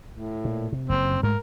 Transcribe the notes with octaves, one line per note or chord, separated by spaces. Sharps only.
A2
A#2
C3
F#1 F#2 C4
G#2 G#3 A3 A#4